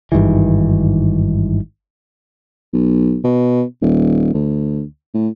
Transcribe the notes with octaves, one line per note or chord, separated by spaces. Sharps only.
G#1 G2 D#3 E3
B1
B2
D#1
D2
A2